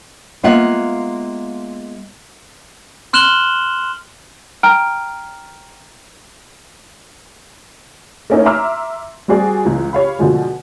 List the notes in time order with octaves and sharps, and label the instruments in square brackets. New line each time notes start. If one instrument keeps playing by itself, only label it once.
[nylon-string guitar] G#3 A#3 B3 F4 E5 F#5
[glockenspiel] C6 F6 F#6 E7 F#7 G7
[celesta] G5 A#5 F6 D7
[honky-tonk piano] A3 A#3 C#4 D#4 E4 B4
E5 A#5 C6 D6 E6 F6
G3 C4 F#4 G#4 D5
C#2 E3
G4 C#5 F5 B5
B2 D3 F3 G#3